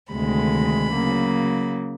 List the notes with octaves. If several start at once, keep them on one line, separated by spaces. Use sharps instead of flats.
D2 C3 D#3 G#3 B5
C#3 F#3 A#3